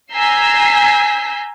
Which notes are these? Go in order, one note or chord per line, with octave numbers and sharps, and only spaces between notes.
G#5 A#5 E6 G6 B6 C7